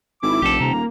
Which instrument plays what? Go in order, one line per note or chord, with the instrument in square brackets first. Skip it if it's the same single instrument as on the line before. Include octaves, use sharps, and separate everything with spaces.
[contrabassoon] G#1 [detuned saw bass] E4 [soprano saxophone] D6
[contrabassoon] F1 [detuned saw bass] A#1 [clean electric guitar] G4 A4
[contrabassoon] D#1 [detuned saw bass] C3 [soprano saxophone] A#5
[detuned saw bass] A#3